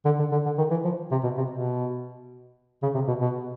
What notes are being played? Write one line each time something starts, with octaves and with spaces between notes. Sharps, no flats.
D3
D3
D3
D3
D#3
E3
F3
C3
B2
C3
B2
C#3
C3
B2
B2